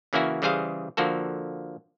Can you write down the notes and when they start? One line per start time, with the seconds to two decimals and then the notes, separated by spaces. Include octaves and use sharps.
0.13 C#3 E3 A#3 C#4 E4 F#4
0.42 C#3 E3 G3 G#4 C5 F5
0.97 D3 F3 A#3 F#4 A4